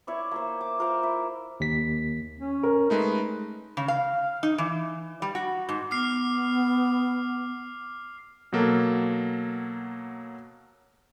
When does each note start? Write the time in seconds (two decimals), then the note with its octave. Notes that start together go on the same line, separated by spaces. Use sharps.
0.07 E4 C#5 D5
0.31 A#3 E4 C5
0.61 D6
0.79 F4 A#4 C5 F5
1.03 E4
1.60 D#2 B6
2.40 C#4
2.63 A#4
2.90 G#3 A3 D#4 B4
3.77 C#3
3.88 F5
4.43 D#4
4.58 E3
5.22 G3
5.35 F#4
5.69 G#2
5.91 B3 D6 F6 C7
8.52 B2 F#3 A#3 A4